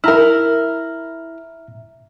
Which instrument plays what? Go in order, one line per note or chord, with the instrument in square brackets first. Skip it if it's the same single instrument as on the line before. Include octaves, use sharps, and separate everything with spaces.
[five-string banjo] E4 A#4 [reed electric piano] E5 A#5 F6